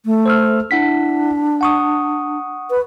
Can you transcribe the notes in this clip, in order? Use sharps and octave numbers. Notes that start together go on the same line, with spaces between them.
A3
C5 E6 F6
D4 E4 F#5 B6
F#5 C#6 D#6
B4